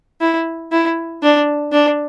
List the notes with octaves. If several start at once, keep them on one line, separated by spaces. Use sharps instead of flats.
E4
E4
D4
D4